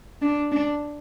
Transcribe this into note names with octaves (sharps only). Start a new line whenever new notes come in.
D4
D4